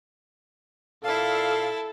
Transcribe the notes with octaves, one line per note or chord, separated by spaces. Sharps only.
A#2 E4 A4 D5 F5 A5